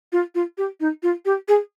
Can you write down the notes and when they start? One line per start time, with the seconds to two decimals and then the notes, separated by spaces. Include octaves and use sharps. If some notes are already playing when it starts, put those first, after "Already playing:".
0.12 F4
0.34 F4
0.57 G4
0.80 D#4
1.02 F4
1.25 G4
1.48 G#4